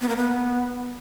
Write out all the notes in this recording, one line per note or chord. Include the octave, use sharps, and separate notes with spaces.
B3
A#3
B3